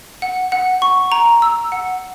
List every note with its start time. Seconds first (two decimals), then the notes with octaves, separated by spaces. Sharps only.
0.22 F#5
0.52 F#5
0.82 C#6
1.12 A#5
1.42 E6
1.72 F#5